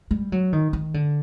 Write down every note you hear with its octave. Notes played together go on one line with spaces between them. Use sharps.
G3
F#3
D#3
D#3
D3